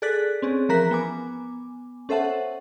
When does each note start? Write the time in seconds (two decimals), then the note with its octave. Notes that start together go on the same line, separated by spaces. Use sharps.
0.02 G#4 A4 D5 F#6 A6 B6
0.42 C4 C#4 G#4
0.69 E3 F3 A#4 A#5 F#6 B6
0.91 B3 G#5 D6
2.09 C#4 A4 C5 E5 F#5 A5